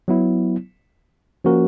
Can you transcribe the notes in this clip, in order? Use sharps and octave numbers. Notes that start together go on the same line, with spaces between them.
F#3 B3 E4
F3 A#3 C#4 F#4 A#4